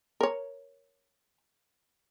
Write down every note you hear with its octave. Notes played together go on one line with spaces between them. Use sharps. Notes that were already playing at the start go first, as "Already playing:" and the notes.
A#4 C#5